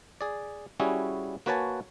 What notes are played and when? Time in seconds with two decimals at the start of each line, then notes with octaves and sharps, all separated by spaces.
0.21 G#4 D5
0.80 G3 C#4 E4 F#4 G#4
1.46 A#3 F#4 B4 C#5 G#5 A5